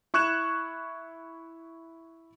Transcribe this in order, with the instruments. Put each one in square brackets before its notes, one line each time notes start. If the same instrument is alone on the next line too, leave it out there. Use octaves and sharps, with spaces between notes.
[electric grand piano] E4 C#6 F#6 G#6 E7